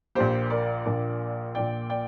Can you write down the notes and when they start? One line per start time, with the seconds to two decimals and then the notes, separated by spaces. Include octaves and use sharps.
0.15 A#1 A#2 A#3 G4 C5
0.50 A#4 D5
0.86 A#1 A#2 A#3
1.55 A#1 A#2 A#3 D5 G5
1.90 D5 G5